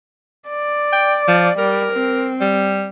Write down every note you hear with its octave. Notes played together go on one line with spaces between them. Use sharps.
D5
G5
F3
G3 A#4
C4
G3